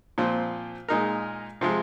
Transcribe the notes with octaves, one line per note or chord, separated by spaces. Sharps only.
A#2 F3 C4
A#2 G#3 D#4 A#4
C3 F3 G#3